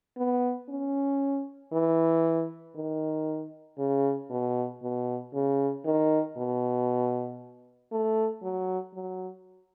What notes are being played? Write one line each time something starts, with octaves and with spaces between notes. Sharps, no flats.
B3
C#4
E3
D#3
C#3
B2
B2
C#3
D#3
B2
A3
F#3
F#3